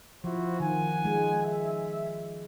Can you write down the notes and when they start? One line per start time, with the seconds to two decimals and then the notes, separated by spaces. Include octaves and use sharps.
0.24 F3 E4 F#4 C5
0.60 D#3 F#5 G#5
1.05 G#3
1.43 E5